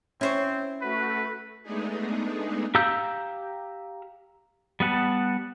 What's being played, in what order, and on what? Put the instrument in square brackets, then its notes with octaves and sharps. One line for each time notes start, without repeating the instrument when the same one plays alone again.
[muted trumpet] C4 [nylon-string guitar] C#4 [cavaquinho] E4 C5 C#6
[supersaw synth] A3 F#4 [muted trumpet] B4
[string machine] G#3 A3 B3 D4 D#4 G#4
[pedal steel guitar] G4 F5 A#5 E6 G6
G3 B3 F#5 A5